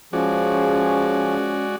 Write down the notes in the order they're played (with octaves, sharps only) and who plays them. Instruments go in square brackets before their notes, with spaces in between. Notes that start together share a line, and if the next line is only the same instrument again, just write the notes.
[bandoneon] F3 [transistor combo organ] G#3 F#4 D5 [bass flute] C#4 [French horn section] G#4